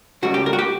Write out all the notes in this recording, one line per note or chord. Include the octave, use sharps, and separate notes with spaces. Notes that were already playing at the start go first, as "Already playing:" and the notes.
C#2 C#3 G3 F#4
G4
A#4
F#4
G4